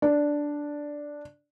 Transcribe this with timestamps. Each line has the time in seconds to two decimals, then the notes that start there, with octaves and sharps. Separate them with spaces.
0.02 D4